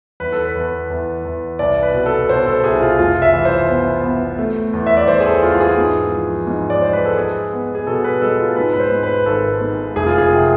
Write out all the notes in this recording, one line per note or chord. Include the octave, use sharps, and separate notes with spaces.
E2 B4
A4
B4
E2
E2
E2
C2 D5
B4
B2
A4
B2 C5
A4
C2 G#4
F4
F1 F4
E5
E3
C5
B3
B3
A3
E2
E5
D5
E2 C5
G#4
A4
E2 F4
F4
G#4
G#2
F3
G#2
D5
G#3 C5
B4
A4
G#3 G#4
B3
G#4
B2 A4
B4
G#3 A4
F4
G#2 B4
B4
C5
G#2
B4
G#1 A4
G#2
F1 G#4
F4
G#4
C3